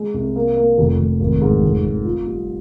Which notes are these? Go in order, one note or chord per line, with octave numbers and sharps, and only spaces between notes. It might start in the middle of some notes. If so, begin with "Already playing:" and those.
Already playing: G#3
C2
A#3
A#3
F1
F1
G#1
G#2
F1
F1
F4
G3